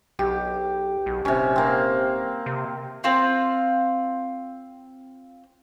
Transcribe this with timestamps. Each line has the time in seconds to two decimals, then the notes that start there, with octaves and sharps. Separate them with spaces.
0.19 B1 G4
1.06 B1
1.25 D#1 C3 C#4
1.56 A#3 C4
2.46 C3
3.04 C4 F4